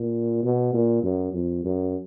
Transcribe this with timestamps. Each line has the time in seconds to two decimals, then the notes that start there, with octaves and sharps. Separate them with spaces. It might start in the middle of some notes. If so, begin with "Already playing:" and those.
Already playing: A#2
0.44 B2
0.74 A#2
1.03 F#2
1.33 F2
1.65 F#2